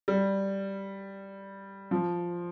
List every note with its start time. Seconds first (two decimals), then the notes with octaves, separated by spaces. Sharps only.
0.08 G3
1.91 F3